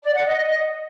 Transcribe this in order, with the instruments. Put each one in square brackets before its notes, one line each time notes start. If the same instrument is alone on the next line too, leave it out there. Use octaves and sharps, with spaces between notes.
[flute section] D5
F#5
D#5